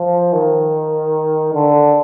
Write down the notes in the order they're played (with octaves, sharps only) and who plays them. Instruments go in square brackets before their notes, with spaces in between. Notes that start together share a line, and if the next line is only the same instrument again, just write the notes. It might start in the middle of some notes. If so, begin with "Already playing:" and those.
Already playing: [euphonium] F3
D#3
D3